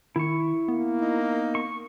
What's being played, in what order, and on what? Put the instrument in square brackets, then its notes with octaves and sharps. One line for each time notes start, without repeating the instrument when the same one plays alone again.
[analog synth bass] D#3 [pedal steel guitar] E4 C#6
[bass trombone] A#3 [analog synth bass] B3
[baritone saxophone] D#4
[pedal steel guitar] C#6